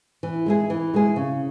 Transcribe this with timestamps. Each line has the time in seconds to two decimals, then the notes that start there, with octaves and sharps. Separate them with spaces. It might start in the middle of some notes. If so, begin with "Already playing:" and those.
0.23 E3
0.46 G#3 E4 G#4
0.70 E3
0.94 G#3 E4 G#4
1.16 C#3